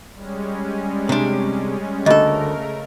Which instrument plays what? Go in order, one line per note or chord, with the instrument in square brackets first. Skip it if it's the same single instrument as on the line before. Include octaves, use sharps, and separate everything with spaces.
[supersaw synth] G3 G#3 C#4
[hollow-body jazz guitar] C3 D4
[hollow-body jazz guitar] D2 A4 [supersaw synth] C#3 A3 A#4 [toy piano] D#5